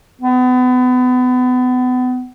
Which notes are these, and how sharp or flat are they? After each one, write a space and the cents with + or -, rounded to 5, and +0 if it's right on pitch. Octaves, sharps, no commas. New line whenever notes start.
B3 +30